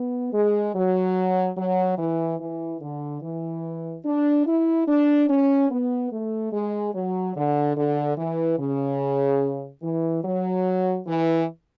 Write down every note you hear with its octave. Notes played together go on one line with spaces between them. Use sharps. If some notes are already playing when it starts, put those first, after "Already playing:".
Already playing: B3
G#3
F#3
F#3
E3
E3
D3
E3
D4
E4
D4
C#4
B3
A3
G#3
F#3
D3
D3
E3
C#3
E3
F#3
E3